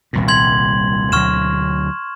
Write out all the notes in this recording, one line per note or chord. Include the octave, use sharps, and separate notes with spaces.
D#1 C2 A#2
C6 G#6 F#7
D2 B2 F#3 C#6 F6 E7